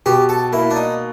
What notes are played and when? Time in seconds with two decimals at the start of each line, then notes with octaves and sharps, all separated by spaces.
0.06 B2 G4
0.29 A4
0.52 A#3 E4
0.70 D4
0.76 D#4